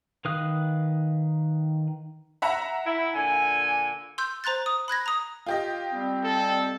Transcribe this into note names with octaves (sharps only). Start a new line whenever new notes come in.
D#3 B4 F5 D#6 F#6
E5 F#5 A#5
E4
A#2 D3 G#5
C6 E6 G6
C5 A#5 C6 F#6 A6
D#6
B5 F#6 G#6 A#6
A#5 D#6
F4 G4 D#5
G3 C4
A4